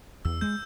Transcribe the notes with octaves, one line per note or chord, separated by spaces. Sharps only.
E2 E6
G#3 G6